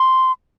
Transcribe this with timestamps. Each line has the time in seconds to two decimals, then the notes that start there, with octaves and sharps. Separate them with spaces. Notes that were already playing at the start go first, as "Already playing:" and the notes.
Already playing: C6